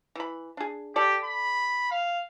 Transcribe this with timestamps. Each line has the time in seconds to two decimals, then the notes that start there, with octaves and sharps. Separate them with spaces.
0.15 E3 B5
0.57 D4 G#4
0.96 G4 A4 D5
1.24 B5
1.91 F5